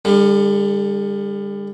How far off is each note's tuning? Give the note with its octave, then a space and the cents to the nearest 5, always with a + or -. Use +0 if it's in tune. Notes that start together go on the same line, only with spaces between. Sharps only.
D3 +5 G3 +40